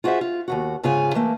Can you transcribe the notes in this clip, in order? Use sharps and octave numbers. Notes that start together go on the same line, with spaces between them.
F4 F#4 G#4 C5 E5
F4
D#2 B2 F#4
G#2 C#3 F4 G#4 F5 G#5
E3 A3 A#3